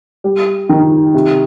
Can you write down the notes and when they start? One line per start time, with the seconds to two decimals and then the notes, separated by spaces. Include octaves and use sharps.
0.24 G3
0.69 D#3
1.14 C3